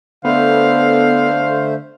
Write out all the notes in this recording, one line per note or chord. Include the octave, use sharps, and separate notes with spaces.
D3 A3 B3 C5 F5